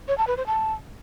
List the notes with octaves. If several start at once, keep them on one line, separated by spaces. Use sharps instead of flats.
C#5
A5
B4
C5
A5